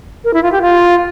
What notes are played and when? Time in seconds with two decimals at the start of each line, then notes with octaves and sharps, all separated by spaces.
0.24 A#4
0.34 E4
0.43 F4
0.52 G4
0.62 F4